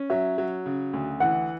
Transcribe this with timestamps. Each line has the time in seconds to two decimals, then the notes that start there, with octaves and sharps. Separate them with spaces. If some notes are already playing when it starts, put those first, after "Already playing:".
Already playing: C#4
0.10 F#3 E5
0.38 F#3
0.66 C#3
0.93 D2
1.20 E3 F#5